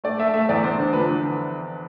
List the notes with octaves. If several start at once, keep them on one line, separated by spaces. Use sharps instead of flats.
A3 D5
A3 E5
A3 E5
E2 D5
E2 C5
D3
F3 B4
D3